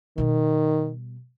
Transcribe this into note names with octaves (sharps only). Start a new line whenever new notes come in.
B2 D#3 G3